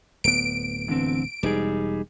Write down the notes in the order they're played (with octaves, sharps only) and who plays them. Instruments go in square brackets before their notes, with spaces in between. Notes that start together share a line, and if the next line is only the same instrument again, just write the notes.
[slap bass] D1 B3 [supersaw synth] D7
[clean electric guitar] E2 D3 C4
[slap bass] E1 [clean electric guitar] G3 D#4 G#4